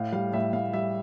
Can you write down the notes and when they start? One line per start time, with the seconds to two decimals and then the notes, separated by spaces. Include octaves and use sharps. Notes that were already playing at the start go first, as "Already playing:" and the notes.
Already playing: A2 F5
0.12 G3 F5
0.33 A2 E5
0.53 A2 F5
0.73 G3 E5